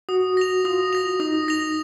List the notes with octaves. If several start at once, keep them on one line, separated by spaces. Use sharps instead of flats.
F#4 D#6
A#6 F7
F4 D#6
A#6 F7
D#4 D#6
A#6 F7